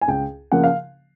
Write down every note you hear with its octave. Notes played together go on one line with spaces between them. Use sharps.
G#5
C#2 G5
C#3 F3 A#3 F#5
F5